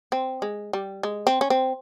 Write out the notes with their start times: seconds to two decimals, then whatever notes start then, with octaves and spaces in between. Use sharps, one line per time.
0.12 C4
0.42 G#3
0.73 G3
1.03 G#3
1.27 C4
1.41 C#4
1.50 C4